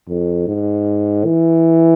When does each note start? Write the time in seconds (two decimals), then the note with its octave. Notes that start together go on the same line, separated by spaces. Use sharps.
0.09 F2
0.48 G#2
1.25 E3